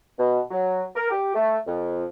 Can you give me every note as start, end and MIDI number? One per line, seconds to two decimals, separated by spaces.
0.18 0.41 47
0.51 0.83 54
0.95 1.09 70
1.10 1.34 67
1.35 1.58 57
1.67 2.05 41